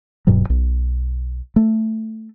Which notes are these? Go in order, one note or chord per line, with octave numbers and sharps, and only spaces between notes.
D1 G2 B2 F#3
B1
A3